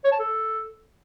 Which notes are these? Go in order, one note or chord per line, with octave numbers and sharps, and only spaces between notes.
C#5
A5
A4